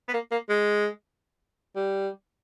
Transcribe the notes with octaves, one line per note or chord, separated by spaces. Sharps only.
B3
A#3
A#3
G#3
G3